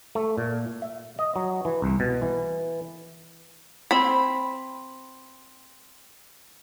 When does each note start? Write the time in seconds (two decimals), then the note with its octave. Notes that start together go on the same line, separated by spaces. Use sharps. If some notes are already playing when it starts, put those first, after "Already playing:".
0.15 A3
0.38 A#2
0.82 E5
1.19 D#5
1.36 F#3
1.65 E3
1.82 C2
2.00 B2
2.22 E3
3.91 C4 B5